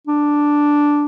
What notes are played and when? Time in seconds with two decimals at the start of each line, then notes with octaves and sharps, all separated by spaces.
0.07 D4